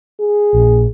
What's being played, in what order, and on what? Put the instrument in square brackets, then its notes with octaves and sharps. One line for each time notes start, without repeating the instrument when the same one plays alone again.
[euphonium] G#4
[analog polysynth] A#1